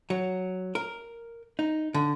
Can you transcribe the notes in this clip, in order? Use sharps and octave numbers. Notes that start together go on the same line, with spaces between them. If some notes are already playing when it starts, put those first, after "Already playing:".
F#3
A#4
D#4
D3